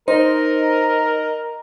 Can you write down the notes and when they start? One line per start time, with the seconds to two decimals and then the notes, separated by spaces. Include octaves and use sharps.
0.08 D#4 A#4 C5 D#5